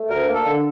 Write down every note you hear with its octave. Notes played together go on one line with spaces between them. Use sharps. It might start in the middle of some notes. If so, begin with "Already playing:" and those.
Already playing: A3
D2 A#4
A#3
A4
D3